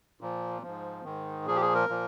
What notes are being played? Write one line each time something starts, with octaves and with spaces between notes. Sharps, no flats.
A#2 F3
G#2 F3
G#2 D#3
A#2 F3 G#4
G4
G#4
A#4
A#2 F3